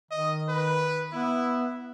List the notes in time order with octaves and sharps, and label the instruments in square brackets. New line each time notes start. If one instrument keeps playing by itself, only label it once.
[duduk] D#3 [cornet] D#5
[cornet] B4
[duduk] B3 [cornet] E4